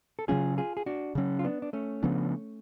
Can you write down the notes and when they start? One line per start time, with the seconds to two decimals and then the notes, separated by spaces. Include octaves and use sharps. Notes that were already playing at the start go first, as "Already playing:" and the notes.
0.19 A4
0.28 C#3 F#3 C#4 F4 G#4
0.58 F4 G#4
0.77 G#4
0.86 D4 F#4
1.15 C#3 F#3 C#4
1.39 F4
1.44 B3 D4
1.62 D4
1.73 A3 C#4
2.03 C#3 F3 B3 D4